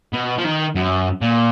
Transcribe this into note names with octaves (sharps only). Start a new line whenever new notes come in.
B2
F3
D#3
F#2
A#2